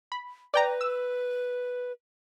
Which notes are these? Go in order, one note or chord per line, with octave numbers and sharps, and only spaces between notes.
B5
B4 D5 G5 A#5
E6